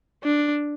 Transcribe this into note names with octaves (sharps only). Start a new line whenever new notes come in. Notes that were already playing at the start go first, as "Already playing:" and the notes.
D4